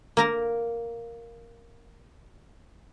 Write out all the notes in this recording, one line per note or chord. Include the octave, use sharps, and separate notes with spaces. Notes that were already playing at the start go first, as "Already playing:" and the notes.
A#3 A#4 A#5